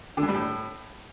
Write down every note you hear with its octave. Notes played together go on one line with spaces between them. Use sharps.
D3
G2
G3
A2